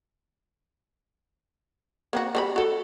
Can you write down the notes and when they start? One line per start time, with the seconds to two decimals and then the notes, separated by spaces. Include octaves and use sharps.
2.13 A#3 C4 F#4
2.35 G3 G#4 B5
2.56 F#4 A4